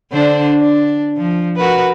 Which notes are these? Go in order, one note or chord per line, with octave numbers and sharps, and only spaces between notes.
D3 D4 C5
D4
F3
F#4 A#4 B4